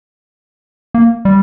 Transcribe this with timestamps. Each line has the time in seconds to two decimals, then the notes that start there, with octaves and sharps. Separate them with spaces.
0.94 A#3
1.25 G3